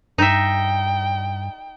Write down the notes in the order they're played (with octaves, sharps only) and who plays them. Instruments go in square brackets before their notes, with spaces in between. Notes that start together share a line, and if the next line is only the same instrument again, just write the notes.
[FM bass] G2 [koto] D#4 E5 [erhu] G5